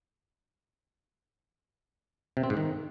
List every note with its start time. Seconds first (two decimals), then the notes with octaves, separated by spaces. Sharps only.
2.37 C3
2.43 C4
2.50 G#2
2.57 D#3